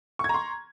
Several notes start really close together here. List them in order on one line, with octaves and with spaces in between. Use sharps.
C#6 G#6 A#5 C6